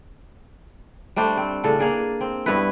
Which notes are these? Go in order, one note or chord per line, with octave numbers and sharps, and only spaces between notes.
G3 A3 D4 C5
C4
A2 C#3 D4 A4
A#3 G#4 D5
C4
G2 B3 E4 B4